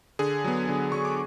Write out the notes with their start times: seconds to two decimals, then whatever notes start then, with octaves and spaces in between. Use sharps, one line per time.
0.19 D3 G#4 G#5
0.44 F#3 B3
0.69 D3
0.92 F#3 B3 C#6
1.05 D6